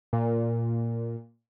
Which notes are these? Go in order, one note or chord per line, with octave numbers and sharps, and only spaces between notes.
A#2